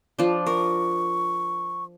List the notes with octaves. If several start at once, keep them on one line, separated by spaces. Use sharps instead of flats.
F3 D4
A#4 C#6